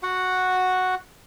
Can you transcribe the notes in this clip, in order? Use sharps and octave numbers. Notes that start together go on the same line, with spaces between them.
F#4 F#5